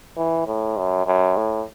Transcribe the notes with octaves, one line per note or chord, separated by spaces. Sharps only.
E3
A2
F#2
F#2
A2